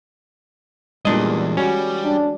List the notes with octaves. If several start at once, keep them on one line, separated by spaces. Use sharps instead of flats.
E2 A#2 E3 G3 G#3 D4 D#5
G3 C#4 F#4
D4